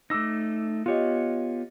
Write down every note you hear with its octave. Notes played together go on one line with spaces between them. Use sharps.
A3 D#4 D6 E6 A#6
B3 F4 G4 C#5 D#5